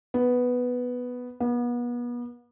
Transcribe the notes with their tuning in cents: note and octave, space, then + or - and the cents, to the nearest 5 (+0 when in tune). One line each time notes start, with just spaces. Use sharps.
B3 +0
B3 -35